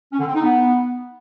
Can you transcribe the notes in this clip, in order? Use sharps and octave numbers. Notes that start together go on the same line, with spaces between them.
C#4
D3
C4
D#4
B3